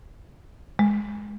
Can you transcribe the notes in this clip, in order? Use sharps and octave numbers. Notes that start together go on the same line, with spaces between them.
G#3